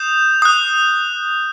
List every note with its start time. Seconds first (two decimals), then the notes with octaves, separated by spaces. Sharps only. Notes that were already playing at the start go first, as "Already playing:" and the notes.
Already playing: D#6 G6 E7
0.42 D#6 F#6